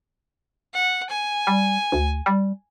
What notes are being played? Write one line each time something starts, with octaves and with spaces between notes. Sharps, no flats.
F#5
G#5
G3
D2
G3